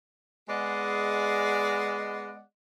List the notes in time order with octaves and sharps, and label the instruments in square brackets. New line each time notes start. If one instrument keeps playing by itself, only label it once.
[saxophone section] G#3 B3 G#4 D5 D#5 F#5